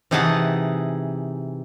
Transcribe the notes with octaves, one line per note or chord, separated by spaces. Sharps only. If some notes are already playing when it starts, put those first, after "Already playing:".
C3 E3 D#4 G#4 F#5 A5